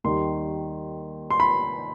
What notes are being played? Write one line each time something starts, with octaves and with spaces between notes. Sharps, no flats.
D#2 D#3 G3 C6
C6
B5